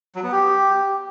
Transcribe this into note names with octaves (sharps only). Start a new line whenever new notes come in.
F#3
B3
G4